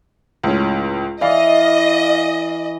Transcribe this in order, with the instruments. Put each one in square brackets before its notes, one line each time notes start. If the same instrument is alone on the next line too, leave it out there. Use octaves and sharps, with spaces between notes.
[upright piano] C#2 A2 C#4
[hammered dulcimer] E3 [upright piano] D5 F5 [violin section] D#5